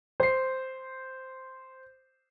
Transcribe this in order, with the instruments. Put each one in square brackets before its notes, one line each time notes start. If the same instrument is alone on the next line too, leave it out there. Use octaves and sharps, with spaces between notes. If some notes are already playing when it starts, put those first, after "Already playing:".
[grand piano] C5 C7